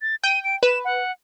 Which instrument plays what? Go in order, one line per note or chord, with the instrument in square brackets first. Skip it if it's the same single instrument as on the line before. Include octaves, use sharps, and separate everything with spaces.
[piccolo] A6
[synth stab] G5 [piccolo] D#7
[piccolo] D7
[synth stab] B4 [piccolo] E7
[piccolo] F#5